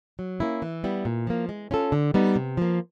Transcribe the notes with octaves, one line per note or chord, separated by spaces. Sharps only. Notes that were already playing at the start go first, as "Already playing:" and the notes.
F#3
A#3 C#4 E4
E3
G3 B3 E4
A#2
F3 A#3
G#3
C#4 F4 A4
D3
G3 B3 D#4
C3
F3 A#3